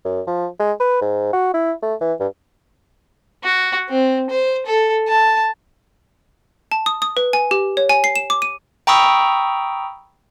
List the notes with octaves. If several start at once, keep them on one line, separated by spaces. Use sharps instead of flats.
F#2
F3
G#3
B4
G#2
F#4
E4
A3
E3
G2
F#4
C4
C5
A4
A5
A5
D#6
D#6
B4
G#5
G4
C#5
G#5
C7
E7
D6
D#7
G5 A#5 B5 C#6 D#6 E6